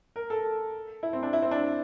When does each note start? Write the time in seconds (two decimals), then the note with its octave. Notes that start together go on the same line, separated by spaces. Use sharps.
0.16 A#4
0.30 A4
1.03 E4
1.13 C4
1.23 D4
1.33 E4
1.42 C4
1.51 D4